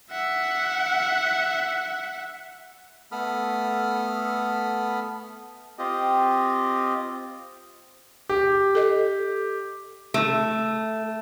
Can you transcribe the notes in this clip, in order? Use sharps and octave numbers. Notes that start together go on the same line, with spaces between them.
E5 F#5
A3 B3 A4 B5 D#6 F6
C4 F4 G4 D#5
G4
A4 D#5
A3